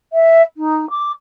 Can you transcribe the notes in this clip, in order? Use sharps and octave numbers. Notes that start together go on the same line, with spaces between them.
E5
D#4
D6